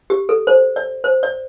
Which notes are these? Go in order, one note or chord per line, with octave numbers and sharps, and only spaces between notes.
G4
A4
C5
D5
C5
D5